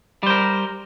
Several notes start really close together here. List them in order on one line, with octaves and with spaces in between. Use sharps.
G3 C5 A#4